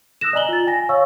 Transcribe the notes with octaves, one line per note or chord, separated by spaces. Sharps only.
D#6 E6 F#6 A#6 E7
D5 D#5 G#5 A#5 F#7 G7
F4 A6
G5 G#5 A#6
C#5 F5 C#6 E6